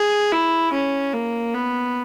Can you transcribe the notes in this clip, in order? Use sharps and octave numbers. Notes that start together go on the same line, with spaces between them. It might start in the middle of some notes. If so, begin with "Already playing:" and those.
Already playing: G#4
E4
C#4
A#3
B3